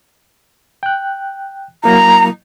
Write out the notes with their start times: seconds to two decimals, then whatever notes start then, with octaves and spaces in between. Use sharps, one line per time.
0.83 G5 F#6
1.84 F#3 A#3 E4 A#5